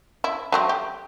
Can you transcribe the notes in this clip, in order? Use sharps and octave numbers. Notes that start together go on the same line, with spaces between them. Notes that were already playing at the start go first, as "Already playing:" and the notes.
E4
F#3 A3 C4
G4